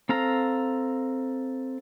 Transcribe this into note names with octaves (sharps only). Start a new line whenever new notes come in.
C4 A4 F5 A#5